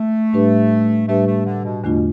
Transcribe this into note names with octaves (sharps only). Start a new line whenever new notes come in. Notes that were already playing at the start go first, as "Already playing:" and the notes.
Already playing: A3
A2 G3 D4 G4 B4
A2 G3 A3 D4 G4 B4
A3
D3
B2
E2 B2 D3 A3 D4 F4